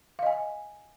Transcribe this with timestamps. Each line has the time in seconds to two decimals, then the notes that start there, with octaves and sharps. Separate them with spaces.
0.19 F5
0.23 D#5
0.27 G#5